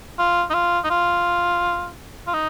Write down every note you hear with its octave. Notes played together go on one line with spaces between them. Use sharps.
F4
D#4
F4
D#4
F4
F4
D#4